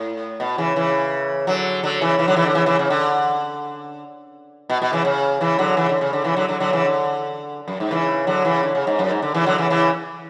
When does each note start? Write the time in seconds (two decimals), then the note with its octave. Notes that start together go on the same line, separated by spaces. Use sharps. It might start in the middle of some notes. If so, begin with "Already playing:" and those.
Already playing: A2
0.40 B2
0.58 C#3 E3
0.76 C#3 E3
1.47 D3 F#3
1.83 D3 F#3
2.01 C#3 E3
2.19 C#3 E3
2.28 D3 F#3
2.37 C#3 E3
2.46 D3
2.54 C#3 E3
2.66 C#3 E3
2.79 C#3
2.90 D3
4.69 B2
4.82 B2
4.93 C#3 E3
5.05 C#3
5.41 C#3 E3
5.58 D3 F#3
5.77 C#3 E3
5.89 D3
6.01 C#3
6.13 D3
6.24 C#3 E3
6.36 D3 F#3
6.48 D3 F#3
6.60 D3 F#3
6.73 C#3 E3
6.85 D3
7.68 F#2
7.80 G#2
7.91 C#3 E3
8.27 D3 F#3
8.45 C#3 E3
8.63 D3
8.75 C#3
8.87 G#2
8.99 F#2
9.10 G#2
9.22 D3
9.34 C#3 E3
9.46 D3 F#3
9.58 C#3 E3
9.70 C#3 E3